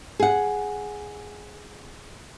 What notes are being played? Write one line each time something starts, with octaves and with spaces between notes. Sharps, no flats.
G#4 F#5